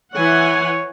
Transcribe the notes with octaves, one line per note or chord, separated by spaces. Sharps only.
E3 C#5 F#5 G#5